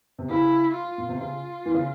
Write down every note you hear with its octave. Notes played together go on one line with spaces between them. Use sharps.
C3
C#3 E4
F4
A#2
C3
C#3 F4
E3
C#3